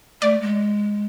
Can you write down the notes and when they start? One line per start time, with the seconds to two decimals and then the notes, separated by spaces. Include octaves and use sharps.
0.22 A3 D5
0.41 G#3